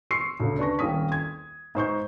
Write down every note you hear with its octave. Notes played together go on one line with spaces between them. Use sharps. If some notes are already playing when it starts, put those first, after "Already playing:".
C6 C#6 E6 C7 C#7
D2 C#3
D4 B4 C#6 A#6
D#1 C2 C#4 D#6 B6
G#6
G#2 C5 C#6 G6